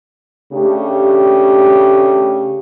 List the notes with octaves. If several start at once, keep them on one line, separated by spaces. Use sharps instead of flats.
C#3 A3 D4 G4